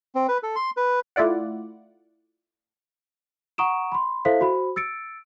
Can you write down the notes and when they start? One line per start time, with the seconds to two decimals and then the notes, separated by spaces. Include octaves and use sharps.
0.15 C4
0.28 B4
0.43 A4
0.56 C6
0.77 B4
1.16 A3 E4 F4 D5 F#5
3.58 F#5 A#5 C#6 D#6 D7 E7
3.92 B5 C6
4.25 E4 A4 C5 E5 F5 B6
4.41 F#4 C5 B5
4.76 E6 A6 C#7 D7